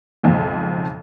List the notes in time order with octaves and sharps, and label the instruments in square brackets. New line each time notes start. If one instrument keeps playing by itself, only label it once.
[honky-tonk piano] F#1 B1 F2 G#2 D#3 F3